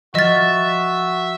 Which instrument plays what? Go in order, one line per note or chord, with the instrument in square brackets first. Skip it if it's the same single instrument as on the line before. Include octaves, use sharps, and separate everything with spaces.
[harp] F3 F6 [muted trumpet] F#4 [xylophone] D#5 A6 [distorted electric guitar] E5